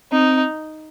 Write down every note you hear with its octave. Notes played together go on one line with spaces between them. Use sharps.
C4 D#4